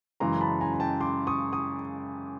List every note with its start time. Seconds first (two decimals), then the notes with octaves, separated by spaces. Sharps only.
0.20 F#2 C#3 E3 G#3 A#5 C6
0.41 A5 B5
0.61 G#5 A#5
0.74 A#5
0.80 G5 A5
1.00 C6 D6
1.27 C#6 D#6
1.53 C#6 D#6